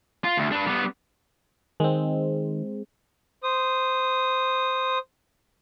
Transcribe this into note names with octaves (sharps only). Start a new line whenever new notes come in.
F4
D2
D4 B4
G3 B3
D#3 G#3 C4
C5 D#6